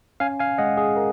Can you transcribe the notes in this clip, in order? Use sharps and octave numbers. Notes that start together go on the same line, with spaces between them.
C#4 F5 G#5
F5 G#5
G#3 D#5 F#5
G#4
A#4